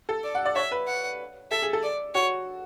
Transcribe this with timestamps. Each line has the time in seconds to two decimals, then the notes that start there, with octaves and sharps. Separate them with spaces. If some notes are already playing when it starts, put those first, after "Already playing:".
0.09 A4
0.24 D5
0.35 F#5
0.45 D5
0.56 C#5 E5
0.71 B4
0.88 F#5
1.51 A4 E5
1.62 G#4
1.73 A4
1.83 D5
2.14 F#4 C#5